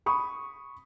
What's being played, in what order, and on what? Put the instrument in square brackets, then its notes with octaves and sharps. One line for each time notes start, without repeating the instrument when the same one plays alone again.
[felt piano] B5 C#6 D#6